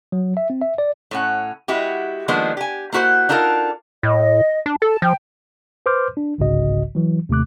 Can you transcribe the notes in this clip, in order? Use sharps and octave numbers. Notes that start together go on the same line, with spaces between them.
F#3
E5
C4
E5
D5
A2 C#4 F#5
G#3 E4 F#4 G4
D#3 F3 G#3 A#3 B3 D4
G4 G#5
A#3 E4 F#4 B4 C5
D4 D#4 F4 A4 A#4
A2 D#5
D4
A4 A5
F3 G5
B4 C5 C6 D6 F6 G6
D4
G1 C2 G#2 C#3 F#4 D#5
E3 F#3
D#2 C3 A3 D6 F#6